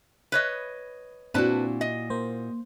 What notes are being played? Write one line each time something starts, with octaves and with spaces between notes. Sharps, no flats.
B4 C#5 D#5
A#2 C4 D4 E4 F#4 B4 A5
D#5
A#3 C5